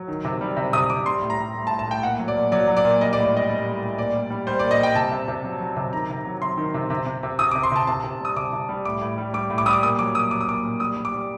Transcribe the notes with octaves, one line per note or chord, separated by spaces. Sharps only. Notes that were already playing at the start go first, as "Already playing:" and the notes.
Already playing: F#3
D#3
C3
G3
C3
C3 D#6
C3 D6
G3 C6
A2
A#5
G3
A2
A5
A2
A5
A2 G5
A#2 F#5
F#3
D5
A#2
F#3 D5
F#3
D5
A#2
G3 D#5
D5
A2
D5
G3 D#5
G3
A2
A2
A#2 D5
G3
G3
G3 C5
D5
A#2
D#5
G3 G5
C3 A5
C3
C3
F#3
F#3
C3
D#3 A#5
C3
F#3
C3 C6
D#3
C3
C3
C3
C3
C3 D#6
D6
C3
C6
C3 A5
C3 A5
C3
G3 D#6
C3 D6
C3
G3
A2 D6
A2
G3
G3 D6
A2
D6
G3 D#6
D6
A#2 D#6
F#3 D6
A#2 D#6
F#3 D6
D#6
A#2 D6
A#2
G3 D#6
G3
D6
G3